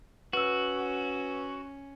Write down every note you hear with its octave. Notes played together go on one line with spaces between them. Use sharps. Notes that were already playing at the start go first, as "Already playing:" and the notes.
C#4 F#4 B4 E6